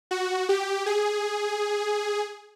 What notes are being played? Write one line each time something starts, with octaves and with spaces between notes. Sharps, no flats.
F#4
G4
G#4